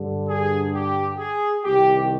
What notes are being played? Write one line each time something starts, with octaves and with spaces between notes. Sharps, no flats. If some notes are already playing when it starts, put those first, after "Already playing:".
Already playing: G2 D3
G#4
G4
G#4
C2 C3 D#3 G4